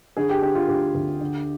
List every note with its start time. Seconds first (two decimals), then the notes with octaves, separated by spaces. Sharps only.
0.17 D3 G#4
0.30 G4
0.42 D3 G4
0.55 F4
0.68 D2 G4
0.95 D2
1.21 D3